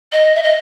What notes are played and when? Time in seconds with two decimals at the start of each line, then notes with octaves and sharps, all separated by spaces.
0.12 D#5
0.34 E5
0.43 D#5